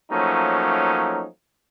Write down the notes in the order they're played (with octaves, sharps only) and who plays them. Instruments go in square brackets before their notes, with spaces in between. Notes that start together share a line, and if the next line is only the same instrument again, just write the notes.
[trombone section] F3 F#3 A3 A#3 C#4 D#4